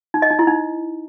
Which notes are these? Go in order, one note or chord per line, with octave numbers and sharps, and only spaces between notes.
D#4
D#5
D#4
E4
D#4